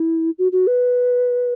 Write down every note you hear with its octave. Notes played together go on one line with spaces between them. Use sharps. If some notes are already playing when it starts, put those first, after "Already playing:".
Already playing: E4
F#4
F#4
B4